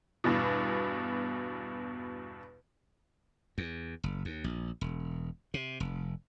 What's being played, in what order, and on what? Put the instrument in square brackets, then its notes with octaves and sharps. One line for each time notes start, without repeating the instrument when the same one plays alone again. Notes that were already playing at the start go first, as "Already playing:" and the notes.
[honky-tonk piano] E2 G2 B2
[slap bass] E2
F#1
D#2
A#1
E1
C3
F1